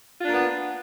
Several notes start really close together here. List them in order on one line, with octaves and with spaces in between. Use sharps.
F4 D4 A#3 B3